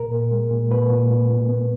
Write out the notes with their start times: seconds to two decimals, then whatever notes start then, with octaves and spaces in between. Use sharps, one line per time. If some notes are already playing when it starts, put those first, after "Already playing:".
Already playing: A#2 A#4
0.11 A#2
0.31 G#3
0.51 A#2
0.71 A#2 B4
0.90 A#2
1.11 A#2
1.30 A#2
1.49 B3